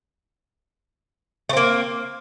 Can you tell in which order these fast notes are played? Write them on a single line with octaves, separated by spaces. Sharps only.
A3 C4 A#3